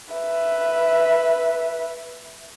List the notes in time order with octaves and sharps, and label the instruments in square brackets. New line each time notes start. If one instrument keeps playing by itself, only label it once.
[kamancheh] B4 E5